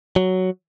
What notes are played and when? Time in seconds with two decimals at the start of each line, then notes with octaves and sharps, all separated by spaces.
0.16 F#3